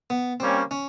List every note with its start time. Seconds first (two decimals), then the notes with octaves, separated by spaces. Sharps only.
0.10 B3
0.40 G3 A#3 C4 C#4
0.71 C#4